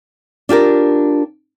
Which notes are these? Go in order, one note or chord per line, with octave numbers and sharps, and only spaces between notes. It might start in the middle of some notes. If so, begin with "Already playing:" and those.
D4 F4 G4 A#4